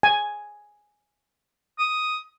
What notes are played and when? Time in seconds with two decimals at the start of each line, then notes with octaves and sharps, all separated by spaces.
0.03 G#5
1.79 D#6